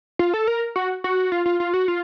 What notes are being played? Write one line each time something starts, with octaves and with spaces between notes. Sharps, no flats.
F4
A4
A#4
F#4
F#4
F4
F4
F4
F#4
F4